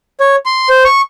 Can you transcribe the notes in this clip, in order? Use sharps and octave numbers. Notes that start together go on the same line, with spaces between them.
C#5
C6
C5
C#6